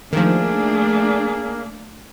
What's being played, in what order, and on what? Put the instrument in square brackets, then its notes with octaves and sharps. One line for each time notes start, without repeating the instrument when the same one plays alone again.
[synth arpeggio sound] D#3 F3 [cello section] A3 D4 [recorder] A#3 [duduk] G#4